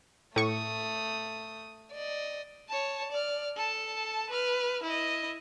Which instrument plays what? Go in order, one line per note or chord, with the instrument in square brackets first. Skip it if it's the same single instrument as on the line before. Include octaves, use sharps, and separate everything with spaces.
[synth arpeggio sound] A2 C#6 [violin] A3 D#6
[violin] D5 D#5
C#5 A5
D5 F6
A4 A5
B4 F6
E4 D#5